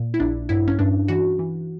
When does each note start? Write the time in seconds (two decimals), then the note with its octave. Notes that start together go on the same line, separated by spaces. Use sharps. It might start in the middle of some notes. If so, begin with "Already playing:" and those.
Already playing: A#2
0.14 E4
0.20 A#1 D4
0.49 G2 E4
0.68 C#4
0.79 G2 D4
1.08 E3 F#4
1.39 E3